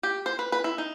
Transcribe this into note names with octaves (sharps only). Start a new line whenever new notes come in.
G4
C5
B4
B4
E4
D#4